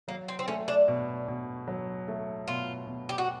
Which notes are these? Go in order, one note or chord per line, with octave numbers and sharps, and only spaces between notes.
F#3 A#3
C4
C4
A3 C#4
D4
B2
B2
F#3
A3
B2 F4
B2
G4
F#4